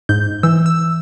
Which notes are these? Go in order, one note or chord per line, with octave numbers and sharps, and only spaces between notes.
G#2 G6
E3 E6
E6